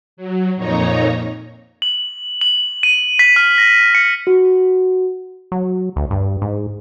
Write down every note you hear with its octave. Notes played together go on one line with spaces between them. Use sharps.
F#3
F2 A#2 D#4 C#5 A#5
F#7
F#7
D#7
B6
F6
A#6
C#7
F#4
F#3
D2
G2
G#2